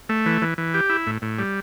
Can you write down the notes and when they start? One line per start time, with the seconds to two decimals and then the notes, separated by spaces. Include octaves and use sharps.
0.09 A3
0.26 E3
0.42 E3
0.58 E3
0.74 G4
0.90 E4
1.07 A2
1.22 A2
1.39 G3